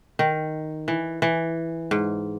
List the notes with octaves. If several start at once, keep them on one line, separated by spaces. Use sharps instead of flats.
D#3
E3
E3
G#2